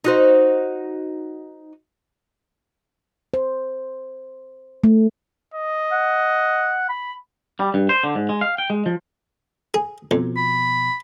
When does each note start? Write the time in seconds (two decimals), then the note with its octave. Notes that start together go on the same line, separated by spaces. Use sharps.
0.04 D#4 F#4 C5
3.34 C5
4.84 A3
5.55 D#5
5.92 F#5
6.89 B5
7.60 G3
7.74 G2
7.89 C5
8.03 D3
8.15 G#2
8.29 G#3
8.41 F5
8.58 G5
8.70 G#3
8.86 F3
9.74 G#4
10.11 F2 B2 F3
10.37 B5